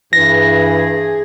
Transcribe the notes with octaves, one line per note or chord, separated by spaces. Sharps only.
G2 E3 G#4 A#6